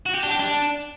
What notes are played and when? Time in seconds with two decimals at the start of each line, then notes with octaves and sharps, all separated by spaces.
0.06 F#4
0.15 G4
0.23 D4
0.32 G4
0.40 D4